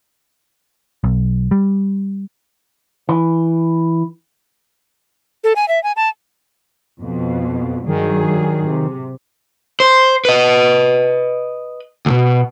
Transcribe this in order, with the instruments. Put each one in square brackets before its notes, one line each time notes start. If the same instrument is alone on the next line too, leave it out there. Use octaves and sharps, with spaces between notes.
[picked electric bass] B1
G3
[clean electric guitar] E3
[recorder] A4
G#5
E5
G#5
A5
[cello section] F2 B2
[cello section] G2 F#3 G#4 [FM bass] D#3
[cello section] C3
[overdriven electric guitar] C5
B4 D#5
D2 B2